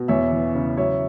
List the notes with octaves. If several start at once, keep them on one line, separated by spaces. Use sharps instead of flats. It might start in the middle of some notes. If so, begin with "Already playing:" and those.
Already playing: B2
E2 C#5 E5
E3
C#3
F#3 C#5 E5